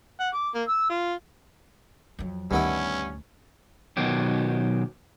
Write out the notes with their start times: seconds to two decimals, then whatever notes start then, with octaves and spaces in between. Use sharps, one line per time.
0.20 F#5
0.34 D6
0.55 A#3
0.68 E6
0.90 F4
2.19 F2 F#3
2.51 D2 G2 D#3 G3 B3 C#4 E4
3.97 B2 D#3 F#3 G4